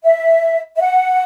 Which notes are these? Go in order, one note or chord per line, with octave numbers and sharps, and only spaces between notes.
E5
E5
F#5